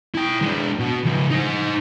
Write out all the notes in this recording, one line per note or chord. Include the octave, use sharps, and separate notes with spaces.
E4 G5
G#3 D4
B2
C#3 F3
D#4 C5